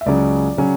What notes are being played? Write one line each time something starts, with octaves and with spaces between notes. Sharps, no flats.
E5
C#2 C#3 F#3 C#4 D5
C#3 F#3 C#4